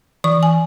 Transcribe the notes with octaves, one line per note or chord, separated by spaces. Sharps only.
E3 C#6
G#5